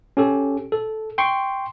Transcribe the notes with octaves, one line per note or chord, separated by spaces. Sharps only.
C#4 G4 A4
A4
G5 C6 C#6